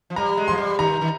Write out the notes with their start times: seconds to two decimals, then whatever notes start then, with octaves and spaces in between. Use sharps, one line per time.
0.10 F3
0.16 G3 A#5
0.37 G#3
0.48 F3 C6
0.58 G3
0.79 D#3 A#5
1.01 D#3